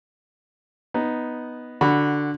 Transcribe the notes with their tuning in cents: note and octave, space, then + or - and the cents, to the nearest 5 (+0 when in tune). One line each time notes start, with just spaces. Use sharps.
B3 +0 D#4 +0
D3 +0 F#4 +0 B5 +0